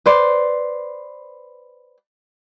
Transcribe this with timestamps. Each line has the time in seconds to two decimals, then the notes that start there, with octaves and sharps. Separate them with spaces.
0.06 B4 C5 D5